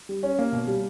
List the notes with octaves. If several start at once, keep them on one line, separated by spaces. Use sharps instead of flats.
G3
C#4
A#3
B2
G3